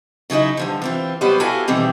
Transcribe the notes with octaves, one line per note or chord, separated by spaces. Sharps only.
C#3 F#3 D#4 E4 F#4
G2 D3 F3
E3 C4 F4
F#3 G3 B3 G4 B4 C5
E4 F#4 G4 A4 F5 G#5
B2 D#3 E3 G3 C4 F4